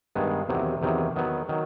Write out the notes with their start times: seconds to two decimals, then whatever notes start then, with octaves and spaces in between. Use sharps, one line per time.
0.15 G2 D#3 G#3 B3
0.49 E2 C3 D#3 F#3
0.82 E2 C3 D#3 F#3
1.16 D#3 F#3 B3
1.49 D#3 F#3